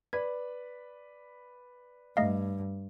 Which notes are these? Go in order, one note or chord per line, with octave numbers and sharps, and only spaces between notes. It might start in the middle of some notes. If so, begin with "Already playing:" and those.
B4 D5 B5 G#6
G2 A3 D#5 F5